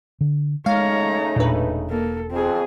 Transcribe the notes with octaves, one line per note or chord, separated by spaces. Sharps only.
D3
C#3 G#3 A3 D#4 C#5 F5 A#5
E1 A#2 D4 B4
A#3 A4
F2 C4 G#4